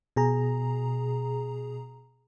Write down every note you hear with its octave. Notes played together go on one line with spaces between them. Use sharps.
B2 G#4 A#5